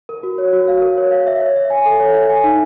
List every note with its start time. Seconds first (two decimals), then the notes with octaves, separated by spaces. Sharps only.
0.09 A#4
0.23 F#4
0.38 C#5
0.53 F#4
0.68 F5
0.82 A#4
0.98 C#5
1.11 F5
1.27 E5
1.41 C#5
1.56 E5
1.70 G#5
1.86 A4
2.00 C#5
2.14 E5
2.30 G#5
2.44 D#4